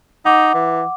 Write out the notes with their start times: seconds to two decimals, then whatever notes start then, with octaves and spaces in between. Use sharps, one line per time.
0.25 D#4 F#5 D6
0.54 E3